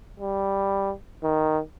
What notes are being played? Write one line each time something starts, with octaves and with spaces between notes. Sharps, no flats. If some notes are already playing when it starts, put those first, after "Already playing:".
G3
D#3